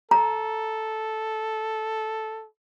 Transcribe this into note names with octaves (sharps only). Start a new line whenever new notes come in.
A4 A#5